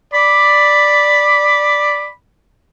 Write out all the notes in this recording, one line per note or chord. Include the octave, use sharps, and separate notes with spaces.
D5 B5 D6